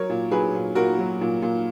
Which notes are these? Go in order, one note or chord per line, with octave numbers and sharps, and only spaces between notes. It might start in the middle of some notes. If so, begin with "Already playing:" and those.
Already playing: F#3 A#4 C#5
A#2
F#3 G#4 B4
A#2
A#2 F#4 A#4
F#3
A#2
A#2